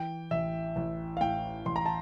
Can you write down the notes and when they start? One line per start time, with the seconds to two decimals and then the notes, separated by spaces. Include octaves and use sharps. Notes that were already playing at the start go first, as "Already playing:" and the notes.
Already playing: E3 G5
0.31 A1 E5
0.76 A1
1.17 F5
1.21 A2 G5
1.66 A1 C6
1.76 A#5
1.86 A5